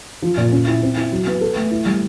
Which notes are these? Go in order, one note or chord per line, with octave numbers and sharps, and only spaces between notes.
F3
A#2
C#4
E4
C4
E4
F#3
B3
A4
A3
E4
G3